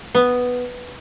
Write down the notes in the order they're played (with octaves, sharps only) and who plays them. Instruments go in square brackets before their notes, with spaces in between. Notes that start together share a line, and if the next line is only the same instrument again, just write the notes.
[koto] B3